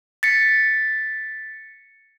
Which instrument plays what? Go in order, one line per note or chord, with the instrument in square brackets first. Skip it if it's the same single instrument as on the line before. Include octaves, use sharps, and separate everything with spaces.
[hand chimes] A6 B6 C#7